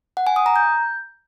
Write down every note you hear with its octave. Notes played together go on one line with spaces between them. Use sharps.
F#5
G#5
D#6
A#5
G6